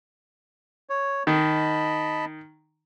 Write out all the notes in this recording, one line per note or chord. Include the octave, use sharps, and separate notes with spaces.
C#5
D#3 D#5 A5 B5